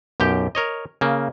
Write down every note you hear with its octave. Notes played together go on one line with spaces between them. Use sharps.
B1 F#2 G4 G5
A#4 C#5 D#5
C#3 A#3